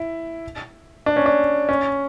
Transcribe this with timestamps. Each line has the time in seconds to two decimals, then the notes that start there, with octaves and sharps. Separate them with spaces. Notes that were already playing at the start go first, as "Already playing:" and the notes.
Already playing: E4
1.06 D4
1.16 C#4
1.26 D4
1.69 C#4